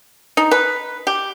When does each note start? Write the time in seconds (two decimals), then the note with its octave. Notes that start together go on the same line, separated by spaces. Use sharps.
0.37 D#4
0.51 B4
1.07 G4